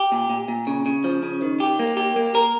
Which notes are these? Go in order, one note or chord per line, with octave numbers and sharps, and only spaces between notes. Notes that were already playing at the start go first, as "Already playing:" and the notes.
Already playing: G4
A#2
A#2
A#2
C#3
C#3
F3
C#3
D#3
G4
A#3
G4
A#3
A#4